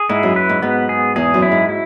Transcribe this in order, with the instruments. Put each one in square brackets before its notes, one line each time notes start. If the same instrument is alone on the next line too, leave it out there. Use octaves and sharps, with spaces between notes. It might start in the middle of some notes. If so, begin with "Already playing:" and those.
Already playing: [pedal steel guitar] G#4
[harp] G#2 [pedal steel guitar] E4
[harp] F#2
[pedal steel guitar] B4
[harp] G#2
[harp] G#2 [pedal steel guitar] B3
[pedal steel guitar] G#4
[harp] E2 [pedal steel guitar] G#4
[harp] F#2
[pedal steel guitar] E4
[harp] G#2
[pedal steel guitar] E4